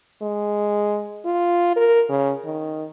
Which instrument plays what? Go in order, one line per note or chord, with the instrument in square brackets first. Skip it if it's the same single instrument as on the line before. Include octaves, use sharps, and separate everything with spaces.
[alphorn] G#3
F4
A#4
C#3
D#3